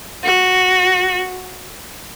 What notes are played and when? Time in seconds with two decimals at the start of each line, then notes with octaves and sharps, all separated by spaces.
0.24 F#4